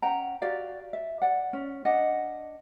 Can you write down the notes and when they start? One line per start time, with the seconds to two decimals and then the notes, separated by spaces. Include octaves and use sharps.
0.02 C#4 F#5 G5 A#5
0.42 F#4 G4 D5 F5
0.93 E5
1.22 D5 F#5
1.53 C#4
1.85 D4 D#5 F#5